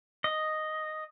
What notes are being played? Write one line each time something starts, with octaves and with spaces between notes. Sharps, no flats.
D#5